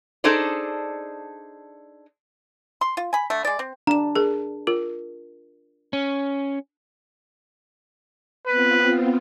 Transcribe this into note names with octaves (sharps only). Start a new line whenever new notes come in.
D4 D#4 G#4 A4 C5 D5
C6
F4
G#5 B5
D3 A3
G#3 D5
C4
D4 A#5 E7
G#4 A#4
F4 A#4
C#4
B3 C4 F4 B4